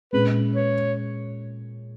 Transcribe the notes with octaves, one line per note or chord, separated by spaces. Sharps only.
A#2 G#3 C#4 G#4 B4
C#5